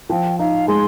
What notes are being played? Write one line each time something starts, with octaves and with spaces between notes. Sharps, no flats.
F3 G5
D#4 F5
G#3 C6